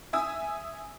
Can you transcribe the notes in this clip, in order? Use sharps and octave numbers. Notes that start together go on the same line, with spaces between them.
E5 G#5 D#6 E6